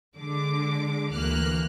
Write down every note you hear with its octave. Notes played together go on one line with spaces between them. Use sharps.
D3 G#3 D6
D2 E3 A#3 F6 F#6